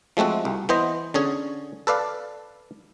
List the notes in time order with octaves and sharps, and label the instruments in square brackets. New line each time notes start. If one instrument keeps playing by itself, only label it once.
[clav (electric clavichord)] F3 G#3 A3 C4 F#4
C2
E3 B3 C5 D#5
D3 C#4 G#4
A4 B4 D5 F5